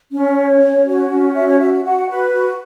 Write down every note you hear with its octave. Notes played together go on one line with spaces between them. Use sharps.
C#4
C#5
C#4
F#4 C#5
C#4
F#4 E5
C#5
F#4 E5
F#4 F#5
B4
F#4